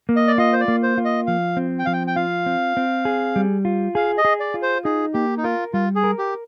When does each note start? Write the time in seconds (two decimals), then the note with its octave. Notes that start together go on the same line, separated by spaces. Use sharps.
0.09 A#3
0.16 D#5
0.28 D5
0.38 F4 D#5
0.53 C5
0.61 D5
0.68 A#3
0.83 C5
0.98 F4
1.05 D#5
1.27 F3 F5
1.57 C4
1.79 G5
1.86 F3 F5
1.93 G5
2.07 G5
2.16 F4 F5
2.46 C4
2.77 C4
3.05 G#4
3.36 G3
3.65 F4
3.95 G#4 F5
4.18 D#5
4.25 G#4
4.40 D5
4.54 F4
4.62 C5
4.85 D#4 G#4
5.14 A#3 G4
5.37 D#4
5.43 F4 A#4
5.73 G3 F4
5.95 G#4
6.04 A#4
6.18 G4